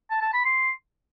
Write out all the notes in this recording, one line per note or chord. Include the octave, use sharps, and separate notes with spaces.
A5
A5
B5
C6